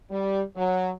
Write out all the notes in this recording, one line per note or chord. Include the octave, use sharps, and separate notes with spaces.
G3
F#3